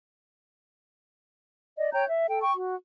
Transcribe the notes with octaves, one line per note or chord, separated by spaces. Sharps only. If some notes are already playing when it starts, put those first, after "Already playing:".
D5 D#5
C#5 G5 A#5 G6
E5
A4 G5
G5 C#6
F#4